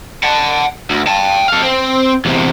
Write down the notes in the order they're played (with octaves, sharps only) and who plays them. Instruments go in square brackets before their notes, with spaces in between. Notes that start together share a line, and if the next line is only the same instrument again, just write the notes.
[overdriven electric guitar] F#5 A5
D2
G5 A5
A4 F5
C4
E2 C3